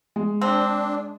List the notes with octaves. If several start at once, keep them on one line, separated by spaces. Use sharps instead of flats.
G#3
C4 D4